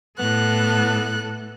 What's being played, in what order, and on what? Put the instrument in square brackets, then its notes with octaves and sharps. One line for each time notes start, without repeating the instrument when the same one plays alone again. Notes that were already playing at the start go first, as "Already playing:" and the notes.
[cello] A2 A4 [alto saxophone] B3 [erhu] F#6